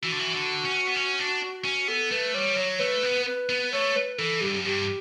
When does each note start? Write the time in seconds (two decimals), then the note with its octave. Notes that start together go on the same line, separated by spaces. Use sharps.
0.03 E3 F#4
0.12 D3
0.19 E3
0.34 D3
0.65 C#4
0.87 B3
0.96 C#4
1.19 D4
1.65 C#4
1.88 B3 A4
2.11 A3 B4
2.34 G3 C#5
2.57 F#3 C#5
2.80 A3 B4
3.03 B3
3.26 B4
3.49 B3
3.73 A3 C#5
3.96 B4
4.18 E3 A4
4.41 G2 G4
4.56 F#2
4.65 G2 G4